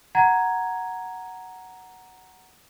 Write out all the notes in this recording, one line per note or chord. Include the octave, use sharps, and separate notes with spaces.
F#5 A#5 G#6